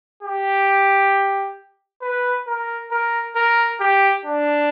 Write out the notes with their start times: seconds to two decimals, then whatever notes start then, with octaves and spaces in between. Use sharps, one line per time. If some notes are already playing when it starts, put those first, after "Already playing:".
0.23 G4
2.01 B4
2.47 A#4
2.91 A#4
3.35 A#4
3.80 G4
4.25 D4